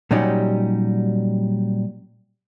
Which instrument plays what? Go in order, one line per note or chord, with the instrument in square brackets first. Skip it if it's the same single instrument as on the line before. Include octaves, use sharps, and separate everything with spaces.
[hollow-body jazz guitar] A#2 F#3 G3 C#4 D#4 G4